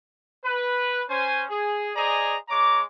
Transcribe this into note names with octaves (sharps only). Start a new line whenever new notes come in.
B4
C#4 C5 G#5
G#4
G#4 C5 D5 D#5 G#5 A#5
G#3 C#5 A#5 D6